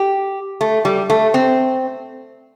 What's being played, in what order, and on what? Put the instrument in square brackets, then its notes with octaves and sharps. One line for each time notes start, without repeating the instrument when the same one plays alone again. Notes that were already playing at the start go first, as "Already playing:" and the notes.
Already playing: [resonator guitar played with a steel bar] G4
A3
G3
A3
C4